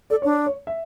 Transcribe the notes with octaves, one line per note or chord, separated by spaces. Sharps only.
A4 D5
D4 C#5
C#5
E5